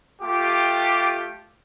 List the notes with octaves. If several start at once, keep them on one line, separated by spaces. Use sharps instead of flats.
A3 F4 G4